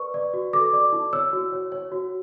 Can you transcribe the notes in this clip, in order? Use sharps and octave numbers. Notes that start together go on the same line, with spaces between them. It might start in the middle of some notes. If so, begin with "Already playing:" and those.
Already playing: B4 D5 C#6
D5
F#4
A4 D6
D5
E4
C#5 E6
F#4
C#5
C#5
F#4